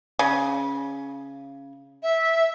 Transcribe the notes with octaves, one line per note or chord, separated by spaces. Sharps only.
C#3
E5